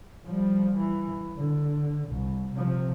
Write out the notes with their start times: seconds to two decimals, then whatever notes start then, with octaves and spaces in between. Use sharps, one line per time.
0.26 F3 G3
0.76 E3
1.37 D3
2.08 C2
2.53 C3 F3